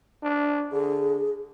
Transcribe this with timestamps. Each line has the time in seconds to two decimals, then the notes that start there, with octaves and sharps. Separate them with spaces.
0.23 D4
0.72 D3 G#4